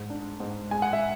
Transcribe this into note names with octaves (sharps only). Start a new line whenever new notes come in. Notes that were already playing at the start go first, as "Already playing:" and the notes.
Already playing: G#2 G#3
D4
G#2
G#3 G#5
F#5
E5